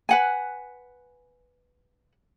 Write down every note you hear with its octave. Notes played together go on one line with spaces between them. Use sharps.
B4 F#5 G#5